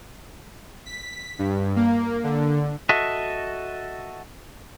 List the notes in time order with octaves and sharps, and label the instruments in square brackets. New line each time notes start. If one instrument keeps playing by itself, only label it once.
[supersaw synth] B6
G2
A#3
D3
[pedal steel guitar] F#4 A4 D#5 E5